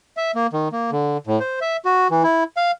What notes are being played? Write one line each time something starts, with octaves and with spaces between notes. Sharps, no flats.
E5
A#3
D#3
A#3
D3
A2
C5
E5
F#4
E3
E4
F5